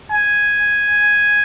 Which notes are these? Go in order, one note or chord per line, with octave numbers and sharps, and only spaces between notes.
G#5